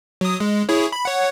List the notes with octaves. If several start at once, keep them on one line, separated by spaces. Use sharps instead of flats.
F#3 D#6
G#3
E4 G#4 C#5
B5
C#5 F#5